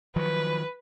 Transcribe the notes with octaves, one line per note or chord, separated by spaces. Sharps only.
D#3 F3 F#3 B4